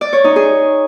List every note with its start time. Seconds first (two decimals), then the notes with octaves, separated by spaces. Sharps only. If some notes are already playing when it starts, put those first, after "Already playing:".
0.01 D5
0.13 C#5
0.24 D#4
0.36 G#4